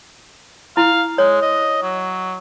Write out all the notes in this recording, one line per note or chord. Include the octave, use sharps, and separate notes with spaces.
E4 F5
G#3 C#5
D#5
F#3